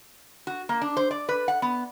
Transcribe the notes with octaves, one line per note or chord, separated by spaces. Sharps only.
F#4
A#3
D4
C5
D5
B4
F#5
B3